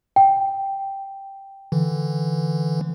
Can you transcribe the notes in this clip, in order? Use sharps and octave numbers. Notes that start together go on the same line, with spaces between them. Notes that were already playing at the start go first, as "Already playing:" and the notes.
G5
D3 E3